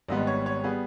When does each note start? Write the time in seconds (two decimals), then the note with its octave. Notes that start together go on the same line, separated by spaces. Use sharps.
0.09 G#1 G#2 G3 B3 D#5
0.27 C#5
0.46 C#5
0.64 G3 B3 G#4